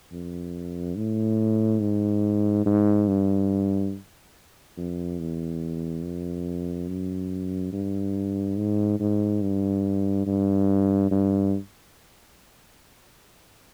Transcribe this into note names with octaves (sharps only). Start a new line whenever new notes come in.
F2
A2
G#2
G#2
G2
F2
E2
F2
F#2
G2
G#2
G#2
G2
G2
G2